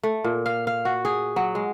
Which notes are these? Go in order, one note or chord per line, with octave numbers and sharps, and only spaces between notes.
A3
A#2
F5
F5
F#4
G#4
F#3
G#3